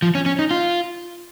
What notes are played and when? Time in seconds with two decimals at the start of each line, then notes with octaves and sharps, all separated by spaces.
0.02 F3
0.15 C#4
0.26 C#4
0.39 D#4
0.51 F4